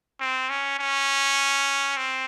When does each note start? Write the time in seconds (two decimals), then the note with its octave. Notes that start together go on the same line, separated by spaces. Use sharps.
0.21 C4
0.50 C#4
0.79 C#4
1.97 C4